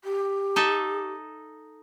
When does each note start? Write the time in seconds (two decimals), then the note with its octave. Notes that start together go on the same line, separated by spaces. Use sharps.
0.04 G4
0.56 D#4 A4 E5